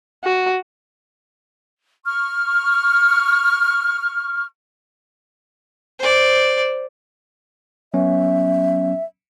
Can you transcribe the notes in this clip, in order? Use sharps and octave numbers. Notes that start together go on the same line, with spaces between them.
F#4
C#6 F6
C5 D5
F#3 B3 C#4 E5